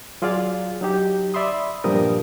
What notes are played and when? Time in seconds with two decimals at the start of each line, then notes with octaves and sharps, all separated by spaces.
0.22 F#3 F4 G#4 D5 F5
0.81 F#3 D#4 G4
1.34 D5 E5 B5 C6 D#6
1.84 G2 A#2 F3 G3 A#4 D#6